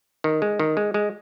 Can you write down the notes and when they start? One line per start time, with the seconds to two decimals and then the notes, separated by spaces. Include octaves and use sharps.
0.24 D#3
0.42 G#3
0.59 D#3
0.77 G#3
0.94 G#3